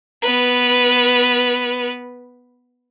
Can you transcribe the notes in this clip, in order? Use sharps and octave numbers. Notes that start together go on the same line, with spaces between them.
B3 B4